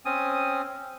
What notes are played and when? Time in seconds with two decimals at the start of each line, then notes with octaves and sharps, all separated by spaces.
0.05 C4 C#4 G#5 D#6